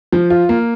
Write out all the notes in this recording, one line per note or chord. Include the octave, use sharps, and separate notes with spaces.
F3
F4
A#3